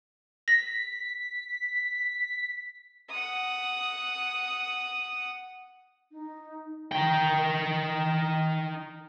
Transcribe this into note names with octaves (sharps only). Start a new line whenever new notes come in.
A#6 B6
F#5 D#6
D#4
D#4 G5